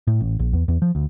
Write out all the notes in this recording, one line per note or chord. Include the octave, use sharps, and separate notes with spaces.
A2
A1
A#1
E2
E2
F3
D2